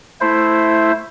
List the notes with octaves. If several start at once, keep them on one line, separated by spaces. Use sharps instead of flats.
A3 E4 C5